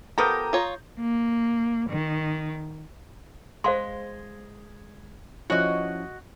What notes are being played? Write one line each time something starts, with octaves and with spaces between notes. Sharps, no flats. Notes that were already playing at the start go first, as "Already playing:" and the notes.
F3 B3 G4 A4 A#4 A#5 D#6 G6
F4 C#5
A#3
D#3
G#3 C5 F5 C6
F3 C#4 E4 F#4 D#5